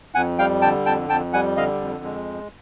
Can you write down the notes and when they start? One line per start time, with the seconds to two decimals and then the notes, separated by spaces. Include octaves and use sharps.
0.15 F2 F#5 G#5
0.39 G3 F5 G5
0.62 D3 G5 A5
0.85 F2 G5 A5
1.09 F2 G5 A5
1.33 G3 F#5 G#5
1.56 D3 D#5 F5
1.81 F2
2.04 G#3